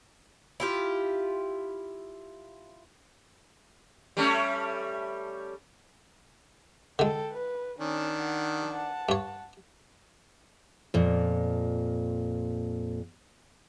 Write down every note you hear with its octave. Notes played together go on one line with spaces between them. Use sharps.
E4 F4 G4
G3 A3 C#4
D3 G#3 A4 G5
B4
D#3 C#4 D4
F#5
F#5 A5
G2 C#5
F2 A#2